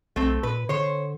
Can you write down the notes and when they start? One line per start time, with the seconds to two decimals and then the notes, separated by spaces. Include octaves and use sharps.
0.16 B1 A3 C4
0.43 A#2 B4
0.69 D3 C5 C#5